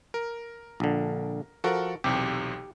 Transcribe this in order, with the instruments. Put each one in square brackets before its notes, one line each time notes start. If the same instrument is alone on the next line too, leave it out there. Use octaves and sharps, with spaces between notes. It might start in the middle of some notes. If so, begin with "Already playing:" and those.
[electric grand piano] A#4
[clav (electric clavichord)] A#1 D3
[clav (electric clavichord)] F3 F#4 [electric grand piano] A4 A#4 F#5
[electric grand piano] B1 E2 C3 [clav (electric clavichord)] G4